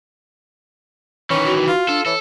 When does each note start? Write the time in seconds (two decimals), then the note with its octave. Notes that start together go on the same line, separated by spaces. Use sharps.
1.30 D#3 E3 C#4
1.45 F#4
1.68 F4
1.88 D4 A4
2.06 E3 A4 C#5